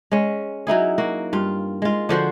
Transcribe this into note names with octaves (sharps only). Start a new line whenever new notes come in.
G#3 C#4
F#3 D#4 E4 G#4
A#3 F#4
G2 F4
G#3 F4
D3 F3 F#4 C5